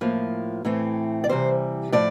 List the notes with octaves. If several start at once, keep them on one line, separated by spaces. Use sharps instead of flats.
A2 F3 A#3
A2 E3 A3 C4
D5
C3 E3 G3 C5
A2 F3 D5